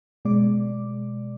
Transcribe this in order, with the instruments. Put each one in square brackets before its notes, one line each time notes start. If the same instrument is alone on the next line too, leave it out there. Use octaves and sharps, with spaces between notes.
[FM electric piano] B2 G#3 D5 D6